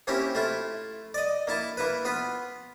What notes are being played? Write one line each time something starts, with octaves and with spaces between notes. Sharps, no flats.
A#3 C4 C#4 E4 G4
A3 E4 F4
D5 D#5
A#3 E4 A5
A#3 E4 B4
B3 F4 B4